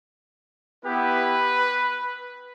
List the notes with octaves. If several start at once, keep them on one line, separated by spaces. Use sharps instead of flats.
B3 E4 G4 B4